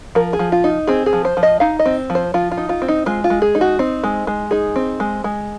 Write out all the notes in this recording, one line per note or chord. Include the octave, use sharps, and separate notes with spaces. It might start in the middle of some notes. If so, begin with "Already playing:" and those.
F3 A#4
G#4
F3
F4
D#4
C4 G#4
G#4
F3
C5
F3
D#5
D#4 F5
D#5
C4
F3
C5
F3 F4
F4
D#4
F4
C4
D#4
G#3 F4
F4
G#3
G#4
D#4
F#4
C4 D#4
G#3
G#3
D#4 G#4
C4
G#3
G#3